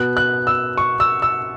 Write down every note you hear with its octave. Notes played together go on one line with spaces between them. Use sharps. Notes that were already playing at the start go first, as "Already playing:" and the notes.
Already playing: B2 B3 F#6
F#6
E6
C#6
E6
E6